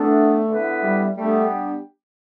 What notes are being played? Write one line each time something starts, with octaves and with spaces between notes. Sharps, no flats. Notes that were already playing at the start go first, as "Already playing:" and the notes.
Already playing: E3 A3 B3 D4 A4
D3 B3 E4 B4 E5
G3
G3 A3 B3 D4 G4